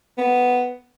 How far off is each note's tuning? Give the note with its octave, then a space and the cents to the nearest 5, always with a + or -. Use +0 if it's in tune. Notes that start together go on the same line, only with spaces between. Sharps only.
B3 +5